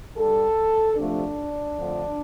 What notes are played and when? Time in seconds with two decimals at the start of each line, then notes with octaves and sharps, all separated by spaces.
0.17 G2 G3 A4
0.96 C3 F3 A3 D4
1.76 F2 D3 F3 A3